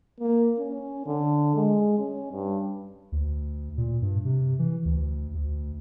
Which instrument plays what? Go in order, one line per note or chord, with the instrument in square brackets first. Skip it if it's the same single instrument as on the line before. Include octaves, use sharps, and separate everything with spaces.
[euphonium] A#3
C#4
D3
G#3
C#4
G2
[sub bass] D2
A#2
G2
C3
E3
D2
D2